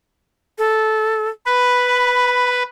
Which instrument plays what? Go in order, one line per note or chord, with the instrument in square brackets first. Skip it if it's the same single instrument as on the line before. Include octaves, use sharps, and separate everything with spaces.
[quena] A4
[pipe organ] B4 [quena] B5